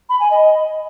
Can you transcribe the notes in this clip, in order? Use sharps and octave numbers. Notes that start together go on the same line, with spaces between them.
B5
G#5
D#5